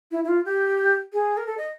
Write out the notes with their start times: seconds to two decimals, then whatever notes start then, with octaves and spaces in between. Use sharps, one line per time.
0.11 E4
0.24 E4
0.28 F4
0.45 G4
1.13 G#4
1.37 A#4
1.47 A4
1.58 D#5